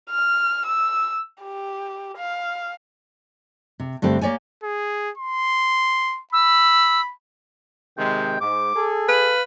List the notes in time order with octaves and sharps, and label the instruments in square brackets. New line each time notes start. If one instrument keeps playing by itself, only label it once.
[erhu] F6
E6
G4
F5
[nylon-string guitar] C3
G2 D3 A3 C4 G4
A#3 G4 C#5 D5 G#5
[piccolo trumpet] G#4
C6
[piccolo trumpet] B5 [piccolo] E6
[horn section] C3 D#3 G#3 [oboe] G5
[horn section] G#2 [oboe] D6
[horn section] G#4 A4
[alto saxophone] B4 [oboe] F5